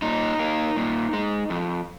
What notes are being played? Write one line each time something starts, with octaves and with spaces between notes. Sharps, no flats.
A#2 D#4
A#3
A#2
G#3
F2